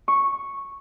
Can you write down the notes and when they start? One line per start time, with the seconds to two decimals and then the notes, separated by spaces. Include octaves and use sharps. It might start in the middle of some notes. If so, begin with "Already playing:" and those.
0.08 C#6